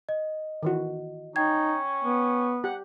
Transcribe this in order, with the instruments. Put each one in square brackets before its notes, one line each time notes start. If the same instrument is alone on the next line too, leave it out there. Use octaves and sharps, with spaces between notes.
[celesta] D#5
[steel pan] D#3 E3 F#4
[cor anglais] C#4 [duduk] D#4 [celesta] G5 G#6
[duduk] B3
[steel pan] G4 [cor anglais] F#5